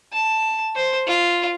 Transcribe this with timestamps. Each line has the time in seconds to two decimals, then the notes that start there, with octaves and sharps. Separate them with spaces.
0.13 A5
0.76 C5
1.07 F4